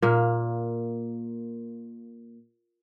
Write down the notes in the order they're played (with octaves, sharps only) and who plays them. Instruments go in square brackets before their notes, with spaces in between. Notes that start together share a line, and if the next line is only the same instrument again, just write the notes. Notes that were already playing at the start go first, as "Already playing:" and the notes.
[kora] A#2 A#3